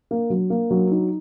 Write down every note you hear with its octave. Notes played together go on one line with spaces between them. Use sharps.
A#3
F#3
A#3
F#3
D#4